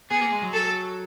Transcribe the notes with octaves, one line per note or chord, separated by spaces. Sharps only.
B3 G#4
A#3
G#3
F#3
A4